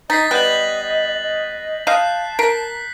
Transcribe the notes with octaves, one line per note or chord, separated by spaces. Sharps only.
D#4 D#5 A6 B6 C7
G3 B3 D#5 F#6 G6 F#7
D#5
D#5 F5 A5 F#6 G6 C7
A#4 B6 C7